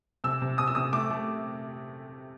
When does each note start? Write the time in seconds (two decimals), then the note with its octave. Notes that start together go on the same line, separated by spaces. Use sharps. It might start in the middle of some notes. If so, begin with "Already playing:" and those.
0.24 C3 E6
0.42 C3
0.58 C3 D#6
0.67 E6
0.75 C3 D#6
0.92 A3 D6
1.11 A3